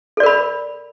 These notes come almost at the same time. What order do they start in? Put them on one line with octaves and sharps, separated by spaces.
A4 D5 A#4 B5